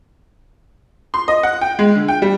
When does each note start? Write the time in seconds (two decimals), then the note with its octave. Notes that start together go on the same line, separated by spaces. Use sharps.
1.14 C6
1.28 D#5
1.43 F#5
1.61 G5
1.79 G#3
1.95 D3
2.08 G5
2.22 G3